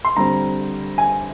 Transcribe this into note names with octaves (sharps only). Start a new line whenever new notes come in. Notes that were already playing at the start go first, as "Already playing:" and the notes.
C6
D3 G3 C4 A#5
G#5